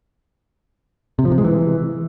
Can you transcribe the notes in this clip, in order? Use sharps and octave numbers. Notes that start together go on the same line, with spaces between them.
C3
F3
C3
G#3
E3